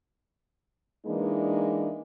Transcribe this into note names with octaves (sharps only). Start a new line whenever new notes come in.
E3 G#3 A#3 D4 D#4